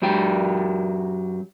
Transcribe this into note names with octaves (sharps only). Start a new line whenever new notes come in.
F#2 F#3 G4 G5